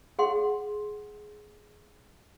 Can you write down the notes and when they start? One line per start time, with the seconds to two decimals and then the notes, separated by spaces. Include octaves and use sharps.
0.19 G#4 F#5 C6